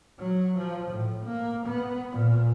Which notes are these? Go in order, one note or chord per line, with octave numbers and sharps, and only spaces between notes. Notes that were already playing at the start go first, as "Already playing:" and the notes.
F#3
F3
A2
A#3
B3
A#2